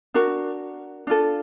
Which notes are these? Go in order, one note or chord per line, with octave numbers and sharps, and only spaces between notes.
D4 F#4 A#4
D4 F4 A4